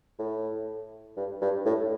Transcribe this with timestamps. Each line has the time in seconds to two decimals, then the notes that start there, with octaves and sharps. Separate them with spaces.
0.19 A2
1.17 G2
1.41 G2
1.65 A2